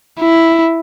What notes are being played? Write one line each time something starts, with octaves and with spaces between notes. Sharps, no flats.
E4